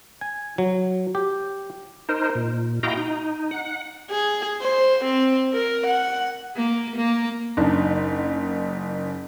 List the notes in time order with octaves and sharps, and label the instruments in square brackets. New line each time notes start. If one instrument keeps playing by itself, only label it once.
[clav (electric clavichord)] G#5
F#3
G4
[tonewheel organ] D#4 A#4 C5
A#2
E4 F#4 D#5 F5 G5 A#5
D#4
F#5
[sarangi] G#4
C5
C4
A#4
F#5
[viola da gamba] A#3
A#3
[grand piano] F#1 D4 D#4